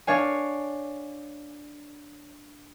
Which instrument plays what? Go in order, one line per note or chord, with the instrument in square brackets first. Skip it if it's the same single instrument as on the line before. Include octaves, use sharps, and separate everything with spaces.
[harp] D4 C#5 F5 G#5